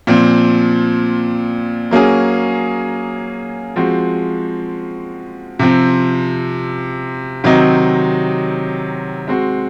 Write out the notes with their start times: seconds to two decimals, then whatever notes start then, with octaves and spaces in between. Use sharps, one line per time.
0.07 A#2 F3 C4
1.91 F#3 A#3 C#4 G#4
3.76 F3 G#3 C4 F#4
5.59 C3 F3 C4
7.44 C3 D#3 F#3 C4 D#4
9.28 G#3 C4 F#4